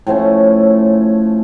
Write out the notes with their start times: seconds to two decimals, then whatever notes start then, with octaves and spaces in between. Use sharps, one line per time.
0.07 A2 F3 A3 C#4